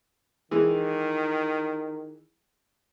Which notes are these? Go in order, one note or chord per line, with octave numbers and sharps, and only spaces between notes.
D#3 E3 G#3